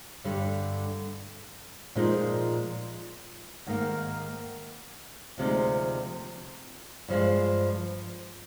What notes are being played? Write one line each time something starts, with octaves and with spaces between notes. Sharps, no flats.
G2 D3 G3
A#2 F3 G#3 D#4
G#2 D#3 A#3
D2 C3 F3 G#3 D#4
G2 F3 G#3